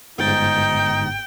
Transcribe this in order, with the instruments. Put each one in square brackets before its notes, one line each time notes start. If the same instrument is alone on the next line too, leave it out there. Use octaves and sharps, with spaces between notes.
[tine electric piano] G1 G#2 A6 [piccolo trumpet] D#4 [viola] G5